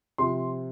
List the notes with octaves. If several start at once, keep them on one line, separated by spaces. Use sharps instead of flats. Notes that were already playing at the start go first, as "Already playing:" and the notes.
C3 F3 C6